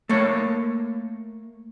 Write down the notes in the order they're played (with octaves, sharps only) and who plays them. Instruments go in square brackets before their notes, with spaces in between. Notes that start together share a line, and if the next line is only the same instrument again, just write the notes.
[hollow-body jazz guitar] A3 A#3 C#5